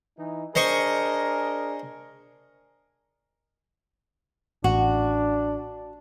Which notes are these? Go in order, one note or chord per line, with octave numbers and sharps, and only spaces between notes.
E3 D#4
D4 G#4 A#4 C5 D#5 C#6
A1 D4 F#4